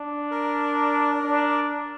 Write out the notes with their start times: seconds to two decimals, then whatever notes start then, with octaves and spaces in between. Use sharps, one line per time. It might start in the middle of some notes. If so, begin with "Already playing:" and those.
Already playing: D4
0.31 A#4
1.23 D4